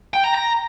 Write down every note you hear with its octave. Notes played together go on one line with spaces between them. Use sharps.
G5
A#5
A#5